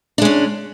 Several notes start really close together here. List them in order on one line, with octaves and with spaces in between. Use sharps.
D4 G#3 C#4